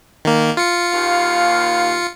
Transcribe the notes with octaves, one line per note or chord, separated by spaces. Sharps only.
D#3 A#3
F4 C#7
D#2 F5